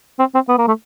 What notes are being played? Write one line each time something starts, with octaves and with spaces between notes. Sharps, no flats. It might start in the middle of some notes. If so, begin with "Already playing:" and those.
C4
C4
B3
A#3
A3